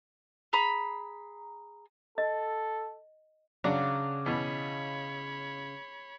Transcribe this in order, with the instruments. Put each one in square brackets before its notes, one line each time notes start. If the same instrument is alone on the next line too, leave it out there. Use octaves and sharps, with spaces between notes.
[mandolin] G#4 A#5 B5
[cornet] A4 [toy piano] D#5
[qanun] C#3 A#5 C#6 [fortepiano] F#3 D4 [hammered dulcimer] D6
[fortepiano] B2 E3 [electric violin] C#5 B5